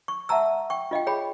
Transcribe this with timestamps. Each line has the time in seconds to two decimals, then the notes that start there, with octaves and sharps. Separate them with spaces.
0.08 C#6
0.29 E5 F#5 A5 A#5 E6
0.70 G5 C#6
0.91 F4 D#5 F5 G5
1.07 G#4 C#5 G5 B5